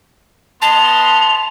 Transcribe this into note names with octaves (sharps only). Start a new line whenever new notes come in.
B3 D#5 A5 C6 F7